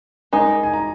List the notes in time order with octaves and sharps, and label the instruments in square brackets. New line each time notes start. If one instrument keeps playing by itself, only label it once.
[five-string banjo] G#3 D#4 A#4 [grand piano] A#5
[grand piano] G#5
A#5